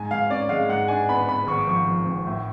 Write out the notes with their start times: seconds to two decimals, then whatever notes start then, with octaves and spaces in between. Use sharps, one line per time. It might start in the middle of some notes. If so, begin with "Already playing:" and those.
Already playing: G#2 G#5
0.11 G#2 F5
0.30 C#4 D5
0.49 G#3 F5
0.69 G#2 F#5
0.88 D4 G#5
1.09 B3 B5
1.28 B3 B5
1.47 G#1 C#6
1.58 D6
1.67 F3 C#6
1.87 F3
2.07 G#1
2.27 A2